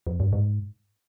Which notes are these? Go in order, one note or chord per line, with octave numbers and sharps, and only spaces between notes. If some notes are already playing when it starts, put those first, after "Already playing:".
F2
G2
G#2